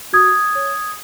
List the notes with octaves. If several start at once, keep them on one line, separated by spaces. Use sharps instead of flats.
F#4 D#6 G#6
C#5